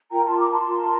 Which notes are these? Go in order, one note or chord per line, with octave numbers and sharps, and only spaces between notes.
F4 A#4 G5 A#5
A5 C6
A#5 D6
A5 C6
F4 A#4